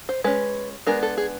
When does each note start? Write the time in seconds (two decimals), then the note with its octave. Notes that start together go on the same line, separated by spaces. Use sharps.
0.09 C5
0.24 G#3 C#4 B4
0.87 G#3 B3 D4 A#4
1.02 A4
1.18 G#4